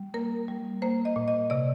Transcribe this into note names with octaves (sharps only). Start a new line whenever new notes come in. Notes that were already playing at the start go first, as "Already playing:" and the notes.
Already playing: G3
A#3 A#4
G3
A#3 C5
D#5
A#2
D#5
C3 D5